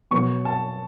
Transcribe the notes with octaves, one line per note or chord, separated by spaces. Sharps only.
B2 F#3 B3 C#6
A5